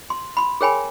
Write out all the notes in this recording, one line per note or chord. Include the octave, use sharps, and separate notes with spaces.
C6
B5 C6
G#4 A#4 C#5 G5 G#5 B5